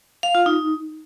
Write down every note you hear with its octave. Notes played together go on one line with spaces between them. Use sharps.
F5
F4
D#4